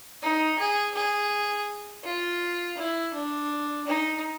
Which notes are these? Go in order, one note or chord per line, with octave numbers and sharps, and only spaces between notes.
D#4
G#4
G#4
F4
E4
D4
D#4